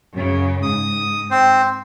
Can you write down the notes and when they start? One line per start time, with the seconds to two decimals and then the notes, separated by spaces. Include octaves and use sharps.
0.14 F#2 C#3
0.63 G#2 D#6
1.31 C4 C5